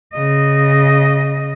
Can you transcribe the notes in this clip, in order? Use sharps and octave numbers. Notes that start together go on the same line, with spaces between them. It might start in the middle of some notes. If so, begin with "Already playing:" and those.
C#3 D#5